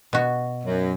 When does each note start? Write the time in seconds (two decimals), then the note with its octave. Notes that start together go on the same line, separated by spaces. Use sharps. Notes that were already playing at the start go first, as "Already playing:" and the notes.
0.13 B2 F#4
0.64 F#2